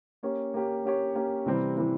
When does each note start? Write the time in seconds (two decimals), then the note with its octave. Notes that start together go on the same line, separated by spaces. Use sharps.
0.23 A#3 C#4 G4 C#5
0.54 A#3 C#4 G4 C#5
0.85 A#3 C#4 G4 C#5
1.15 A#3 C#4 G4 C#5
1.46 C3 E3 G3 C4 E4
1.76 C3 E3 G3 C4 E4